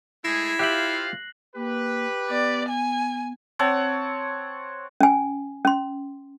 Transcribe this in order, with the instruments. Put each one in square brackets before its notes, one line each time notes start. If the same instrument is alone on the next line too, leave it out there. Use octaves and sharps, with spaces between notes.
[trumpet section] G#3 A3 G#4 [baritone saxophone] E4 [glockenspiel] A#6 C7
[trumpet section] F4 C5 F5 [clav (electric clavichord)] G4 E5 G5 [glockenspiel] F#6 F#7
[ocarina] A#3 [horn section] G4 B4
[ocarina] B3 [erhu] D5
[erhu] G#5
[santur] C4 C#5 F#5 A5
[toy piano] C#4 G#5
C#4 C6